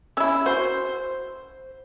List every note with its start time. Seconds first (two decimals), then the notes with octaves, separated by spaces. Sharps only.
0.17 C#4 E4 E6
0.46 F#4 C5